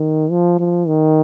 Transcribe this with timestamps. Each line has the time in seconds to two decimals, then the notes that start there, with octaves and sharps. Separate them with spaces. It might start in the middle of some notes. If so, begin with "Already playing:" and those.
Already playing: D#3
0.31 F3
0.59 F3
0.88 D#3